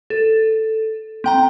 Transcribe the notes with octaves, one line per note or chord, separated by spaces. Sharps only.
A4
C4 G5 A#5